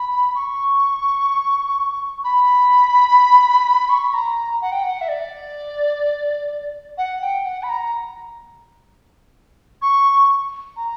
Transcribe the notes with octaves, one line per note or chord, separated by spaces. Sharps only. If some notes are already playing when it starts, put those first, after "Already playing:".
Already playing: B5
C#6
B5
C#6
B5
A#5
F#5
G5
F#5
E5
D5
F#5
G5
F#5
B5
A#5
C#6
A#5